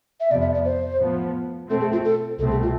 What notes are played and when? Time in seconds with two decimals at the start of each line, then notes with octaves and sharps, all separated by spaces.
0.20 E5
0.30 F2 C3 F3 B3 D5
0.42 E5
0.54 D5
0.65 C5
1.00 A2 F3 B3
1.69 B2 A3 C4 A4
1.81 G#4
1.92 F4
2.04 A4
2.39 C2 B2 A3 C4 A4
2.51 G#4
2.63 F4